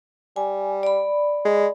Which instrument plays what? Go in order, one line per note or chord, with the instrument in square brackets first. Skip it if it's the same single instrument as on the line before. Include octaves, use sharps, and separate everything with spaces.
[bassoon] G3 [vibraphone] G#5
[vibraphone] D5 B5
[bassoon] G#3